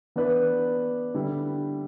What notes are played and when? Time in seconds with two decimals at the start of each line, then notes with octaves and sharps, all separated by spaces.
0.16 E3 B3 D4 B4
1.14 D3 G3 E4